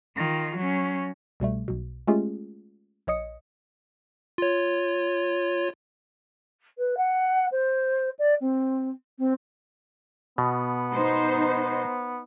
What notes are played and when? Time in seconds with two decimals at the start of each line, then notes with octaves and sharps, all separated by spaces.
0.16 D#3 F4
0.56 F#3 C#4
1.40 C2 B2 G3 A3
1.68 B1 B2
2.07 G#3 A3 C#4 F4 G4 G#4
3.07 A#1 C#5 D#5 D#6 C#7
4.38 F4 C#5
6.78 B4
6.97 F#5
7.51 C5
8.19 D5
8.40 C4
9.18 C4
10.38 B2 B3
10.94 D#4 C5